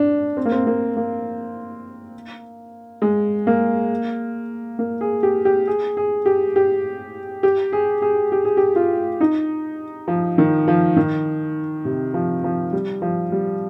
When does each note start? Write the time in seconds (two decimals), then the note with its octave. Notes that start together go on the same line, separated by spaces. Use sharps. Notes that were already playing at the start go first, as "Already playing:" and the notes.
Already playing: D4
0.37 C4
0.45 A#3
0.52 C4
0.67 A#3
0.97 A#3
3.02 G#3
3.47 A#3
4.79 A#3
5.01 G#4
5.23 G4
5.45 G4
5.67 G#4
5.97 G#4
6.26 G4
6.56 G4
7.43 G4
7.73 G#4
8.02 G#4
8.32 G4
8.45 G#4
8.57 G4
8.76 F4
9.21 D#4
10.08 F3
10.38 D#3
10.68 F3
10.96 D#3
11.85 C3
12.14 F3
12.44 F3
12.73 G3
13.02 F3
13.32 G3